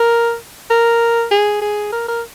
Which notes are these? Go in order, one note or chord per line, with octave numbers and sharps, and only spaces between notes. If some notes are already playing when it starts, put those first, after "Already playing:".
Already playing: A#4
A#4
G#4
G#4
A#4
A#4